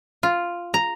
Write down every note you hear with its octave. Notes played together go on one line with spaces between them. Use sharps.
F4
A#5